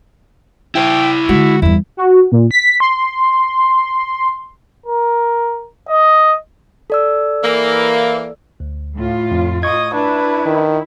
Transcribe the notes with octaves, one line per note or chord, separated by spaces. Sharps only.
E4 C5 G5
D3 G#3 F#4
E2 G2 E4
F#4
A#2
B6
C6
A#4
D#5
A4 D5 E6
E3 A#3
D2
A2 F4
F2
D#5 C#6 D#6 G#6
D4 E4 B4
D#3